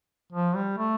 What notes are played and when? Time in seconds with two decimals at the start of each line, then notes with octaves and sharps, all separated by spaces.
0.33 F3
0.55 G3
0.78 A3